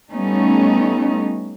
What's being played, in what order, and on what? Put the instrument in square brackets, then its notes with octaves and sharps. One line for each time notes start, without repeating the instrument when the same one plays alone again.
[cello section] G3 A3 B3 C#4 D#4